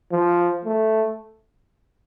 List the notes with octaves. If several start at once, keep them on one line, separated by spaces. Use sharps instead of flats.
F3
A3